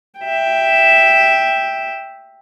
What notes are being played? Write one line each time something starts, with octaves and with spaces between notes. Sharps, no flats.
E5 G5